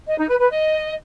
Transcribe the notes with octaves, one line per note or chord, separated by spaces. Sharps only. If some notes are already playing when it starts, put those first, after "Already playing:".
D#5
D#4
B4
B4
D#5